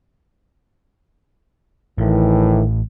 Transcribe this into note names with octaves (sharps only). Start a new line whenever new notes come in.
A1 A2 D#3 E3